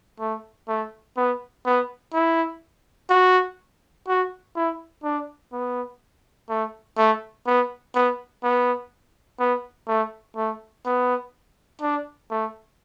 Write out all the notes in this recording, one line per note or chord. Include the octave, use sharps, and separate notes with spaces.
A3
A3
B3
B3
E4
F#4
F#4
E4
D4
B3
A3
A3
B3
B3
B3
B3
A3
A3
B3
D4
A3